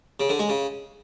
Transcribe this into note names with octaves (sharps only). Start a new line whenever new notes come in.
C#3
D3
G#3
C#3